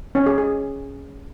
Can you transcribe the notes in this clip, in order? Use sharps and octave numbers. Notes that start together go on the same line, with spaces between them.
C#4
G#4
G#4